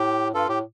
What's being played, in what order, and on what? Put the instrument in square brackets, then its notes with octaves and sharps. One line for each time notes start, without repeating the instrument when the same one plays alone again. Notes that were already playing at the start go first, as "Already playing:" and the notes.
Already playing: [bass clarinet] A2 [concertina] G4
[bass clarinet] G2 [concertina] F4 A4
[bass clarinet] A2 [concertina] G4